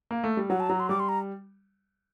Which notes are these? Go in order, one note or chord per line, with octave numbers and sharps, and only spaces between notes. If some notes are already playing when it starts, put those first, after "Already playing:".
A#3
A3
G3
F#3 F#5
A5
F#3 A#5
C6
G3 D6
C6
A#5